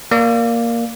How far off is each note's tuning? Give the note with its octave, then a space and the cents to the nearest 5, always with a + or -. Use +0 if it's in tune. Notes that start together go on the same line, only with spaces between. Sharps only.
A#3 +0 D5 +0